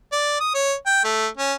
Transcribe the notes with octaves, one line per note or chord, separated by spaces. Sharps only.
D5
D#6
C#5
G5
A3
C#4